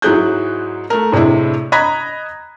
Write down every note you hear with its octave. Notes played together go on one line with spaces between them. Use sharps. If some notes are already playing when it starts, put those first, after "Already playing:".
G#2 F#3 E4 G#4 F#6 G6
A3 A#4
A2 C3 G#3 D4 E4
D#5 A#5 B5 F#6 G#6 B6